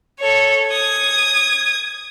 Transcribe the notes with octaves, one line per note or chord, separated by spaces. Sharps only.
A4 C#5
D#6 G#6